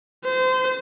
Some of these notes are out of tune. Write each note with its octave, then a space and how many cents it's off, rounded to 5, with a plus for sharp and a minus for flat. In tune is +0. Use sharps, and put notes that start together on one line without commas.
C5 -25